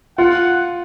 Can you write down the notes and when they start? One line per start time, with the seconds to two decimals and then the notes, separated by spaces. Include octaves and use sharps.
0.18 F4 F#5